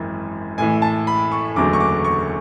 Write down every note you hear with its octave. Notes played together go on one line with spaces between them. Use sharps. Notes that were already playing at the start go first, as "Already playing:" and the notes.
Already playing: G#1 F#2 E3
A1 A2 E3 G#5
A5
B5
C#6
F#1 E2 D3 F#3 A3 D6
C#6
D6
C#6